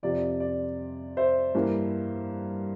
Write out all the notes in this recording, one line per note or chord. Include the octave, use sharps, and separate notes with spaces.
F2 C3 F3 D5
D5
C5 E5
G2 E3 A#3